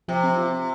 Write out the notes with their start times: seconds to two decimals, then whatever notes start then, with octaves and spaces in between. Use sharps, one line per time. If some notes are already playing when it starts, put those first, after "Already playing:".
0.08 C3 F3
0.23 C4
0.37 F4
0.52 F4